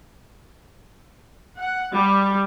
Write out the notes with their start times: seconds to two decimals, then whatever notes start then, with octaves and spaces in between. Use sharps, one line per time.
1.58 F#5
1.94 G3